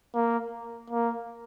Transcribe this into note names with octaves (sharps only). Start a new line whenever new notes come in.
A#3
A#3